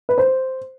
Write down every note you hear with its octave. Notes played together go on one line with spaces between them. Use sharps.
B4
C5